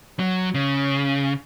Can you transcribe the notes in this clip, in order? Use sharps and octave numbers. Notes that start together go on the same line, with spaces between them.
F#3
C#3